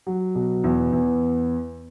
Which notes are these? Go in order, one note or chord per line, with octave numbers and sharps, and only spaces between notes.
F#3
B2
E2
E2